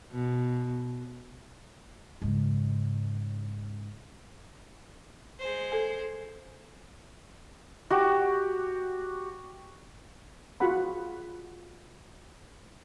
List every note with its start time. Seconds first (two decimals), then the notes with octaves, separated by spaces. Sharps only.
0.12 B2
2.22 G#2 C#3
5.39 G#3 C5
5.72 A4 G#5
7.90 F#4 G4
10.60 F4 F#4 G#4 F#5 B5